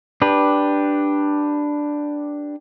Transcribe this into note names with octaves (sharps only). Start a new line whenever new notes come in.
D4 G4 B4